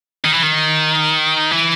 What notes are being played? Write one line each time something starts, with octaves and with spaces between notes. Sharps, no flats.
D#3
E3
D#3
E3